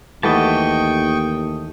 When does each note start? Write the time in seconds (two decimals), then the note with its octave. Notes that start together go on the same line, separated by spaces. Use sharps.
0.23 D#2 E3 A3 F#4 D#5 G5 A5 C#6